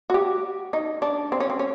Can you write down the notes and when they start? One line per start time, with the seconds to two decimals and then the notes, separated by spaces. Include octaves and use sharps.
0.10 F#4
0.14 G4
0.73 D#4
1.02 D4
1.32 C4
1.40 C#4
1.50 C4
1.59 C#4